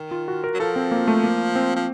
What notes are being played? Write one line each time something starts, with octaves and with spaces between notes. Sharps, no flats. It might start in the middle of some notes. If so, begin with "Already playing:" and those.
Already playing: D#3
F4
F#4
A#4
F#3
F3 A4
C4
A#3
A3
A#3
C4
F3